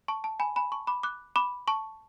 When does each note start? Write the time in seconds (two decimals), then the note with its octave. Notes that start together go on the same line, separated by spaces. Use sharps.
0.08 A5 C#6
0.24 A5
0.40 G#5 B5
0.56 G#5 B5
0.72 A5 C#6
0.87 B5 D6
1.03 D6 F#6
1.36 B5 D6
1.68 A5 C#6